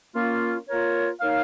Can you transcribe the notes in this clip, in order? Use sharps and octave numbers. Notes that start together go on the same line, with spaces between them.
A#3 C#4 F4
A#3 F4 A#4 C#5
A#3 D#4 C#5 F5